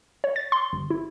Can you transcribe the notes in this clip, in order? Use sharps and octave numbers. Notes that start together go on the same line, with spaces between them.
C#5
A6
C6
G1
E4